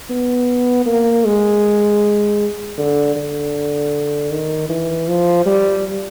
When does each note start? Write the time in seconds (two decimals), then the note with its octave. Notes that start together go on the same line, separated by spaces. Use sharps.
0.10 B3
0.86 A#3
1.25 G#3
2.78 D3
3.16 D3
4.31 D#3
4.69 E3
5.08 F3
5.46 G3